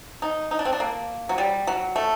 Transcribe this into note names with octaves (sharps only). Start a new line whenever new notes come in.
D#4
D#4
D4
C4
D4
A#3
F#3
G3
F#3
A3